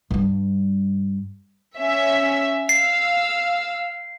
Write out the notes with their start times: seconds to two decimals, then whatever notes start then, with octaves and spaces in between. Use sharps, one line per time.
0.11 G2 G3
1.78 C#4 E5
2.69 F5 E6 C7